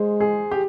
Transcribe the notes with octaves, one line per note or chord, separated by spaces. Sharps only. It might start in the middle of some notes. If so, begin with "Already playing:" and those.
Already playing: G#3 G#4 C5
G#4
G4